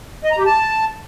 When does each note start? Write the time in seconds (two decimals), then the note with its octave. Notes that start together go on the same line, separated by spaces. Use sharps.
0.24 D#5
0.31 A#5
0.39 G4
0.46 A5